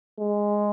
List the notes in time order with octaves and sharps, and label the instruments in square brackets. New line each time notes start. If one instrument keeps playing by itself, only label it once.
[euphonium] G#3